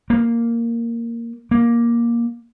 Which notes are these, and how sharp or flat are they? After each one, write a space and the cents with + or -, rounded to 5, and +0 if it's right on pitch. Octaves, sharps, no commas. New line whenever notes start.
A#3 -5
A#3 +10